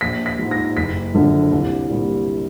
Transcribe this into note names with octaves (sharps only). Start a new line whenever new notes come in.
A#1 B6
B6
G#2 F3
A#6
F#1 B6
F#2 D3 F3
C2
A#2 G3